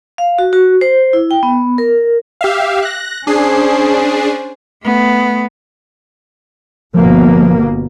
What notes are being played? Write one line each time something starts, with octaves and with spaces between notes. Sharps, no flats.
F5
F#4
F#4
C5
E4
G5
B3
A#4
G4 E5 F5
F#6 A#6
C#4 D4 G#4 C5 C7
A3 B3
G1 B2 F3 A#3